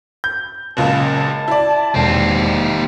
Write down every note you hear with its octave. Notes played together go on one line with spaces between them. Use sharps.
G6
F#1 C#2 A#2 A5
E4 D5
E1 D#2 C4